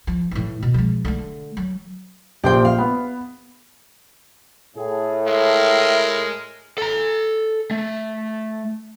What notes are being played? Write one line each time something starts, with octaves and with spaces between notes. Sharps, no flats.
F3
A2 E3
B2
F3 G#3
D3 A3
F#3
A#1 G4 C5 G5
F5
B3
A2 G#4
G#3 A#4 E5
A4 A#5
A3